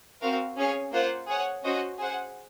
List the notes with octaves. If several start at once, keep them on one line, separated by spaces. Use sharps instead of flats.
C4 F#4 A#4 F5
C#4 G#4 C#5 F5
A#3 F4 C5 F#5
G#4 C#5 F#5
C#4 F#4 C5 D#5
G#4 C5 F#5